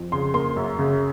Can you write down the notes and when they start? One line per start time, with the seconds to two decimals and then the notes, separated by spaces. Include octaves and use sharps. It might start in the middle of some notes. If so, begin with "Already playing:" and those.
Already playing: F2
0.12 C#3 C6
0.34 A#3 C6
0.56 F#2
0.79 C#3